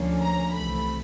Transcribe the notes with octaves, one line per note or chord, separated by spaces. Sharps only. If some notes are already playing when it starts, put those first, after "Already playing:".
Already playing: D2 D3 F3 A#3 C#4
A#5
C2 C3 E3 A3 B5